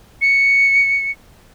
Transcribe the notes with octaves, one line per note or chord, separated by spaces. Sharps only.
C#7